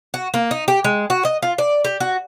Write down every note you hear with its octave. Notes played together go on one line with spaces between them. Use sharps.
F#4
A#3
D#4
G4
G#3
F#4
D#5
F4
D5
G4
F#4